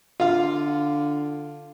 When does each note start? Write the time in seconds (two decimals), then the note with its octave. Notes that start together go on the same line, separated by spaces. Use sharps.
0.20 D3 F4 F5